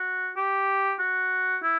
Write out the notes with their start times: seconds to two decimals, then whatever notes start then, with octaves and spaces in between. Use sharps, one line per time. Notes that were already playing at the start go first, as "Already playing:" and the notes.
Already playing: F#4
0.37 G4
1.00 F#4
1.63 E4